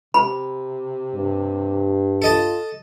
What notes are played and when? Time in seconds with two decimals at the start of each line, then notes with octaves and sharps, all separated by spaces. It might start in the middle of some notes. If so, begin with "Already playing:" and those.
0.14 C3 B5
1.15 G2
2.22 F4 A4 D#5 A5